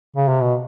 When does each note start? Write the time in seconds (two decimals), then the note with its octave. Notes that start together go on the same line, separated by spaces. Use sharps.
0.16 C#3
0.28 C3
0.41 B2